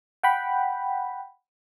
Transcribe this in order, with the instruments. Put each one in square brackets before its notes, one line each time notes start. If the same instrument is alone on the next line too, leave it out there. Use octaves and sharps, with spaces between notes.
[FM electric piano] F#5 G5 B5